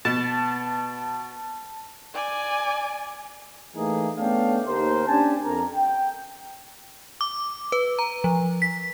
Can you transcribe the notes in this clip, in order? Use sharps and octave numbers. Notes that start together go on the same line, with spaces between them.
B2 A5
D5 G#5
E3 A3 A#3 D#4 G#4
A3 B3 C#4 D4 F5 G5
D#2 A#4 C5
C#4 D4 G4 G#5 A5
F2 A#4 A#5
G5
D6
B4
A#5
F3
B6